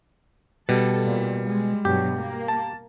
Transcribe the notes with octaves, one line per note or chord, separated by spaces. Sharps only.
B2 G3 A4
A#2
G#3
G2 B2 F#3 G4
A#3
A5